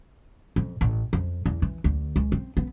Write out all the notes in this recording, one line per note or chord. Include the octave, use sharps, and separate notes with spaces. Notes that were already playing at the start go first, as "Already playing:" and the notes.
F2
A1
F2
E2
E3
D2
C#2
C4
B3